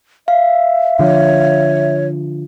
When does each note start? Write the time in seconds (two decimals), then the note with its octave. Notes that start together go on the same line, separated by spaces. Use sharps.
0.28 E5 F5
0.99 D3 F3 C#5